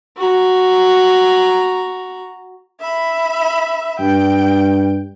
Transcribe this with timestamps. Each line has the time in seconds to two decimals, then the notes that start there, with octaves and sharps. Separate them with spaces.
0.17 F#4 A#5
2.80 E5 B5
3.99 G2 G5